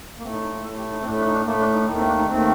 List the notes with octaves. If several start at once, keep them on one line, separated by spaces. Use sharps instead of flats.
A#3
A2 A3 C4
D#4
D#4
F4
A2 A3 A4
G4
D#4
C4
A2 A3 D4
D4
D#4
D4
A2 A3 A#3
D4
D#4
D#2 D#3 A3 D#4
C4
D4
D#4
D#2 D#3 A3 C4